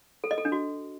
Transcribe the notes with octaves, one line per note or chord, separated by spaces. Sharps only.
A4
D#5
A4
D4
F#4